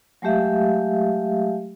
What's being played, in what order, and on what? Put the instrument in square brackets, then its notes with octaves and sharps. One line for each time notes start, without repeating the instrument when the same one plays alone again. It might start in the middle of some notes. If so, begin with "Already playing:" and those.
[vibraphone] F#3 G#3 A3 G4 E5 F5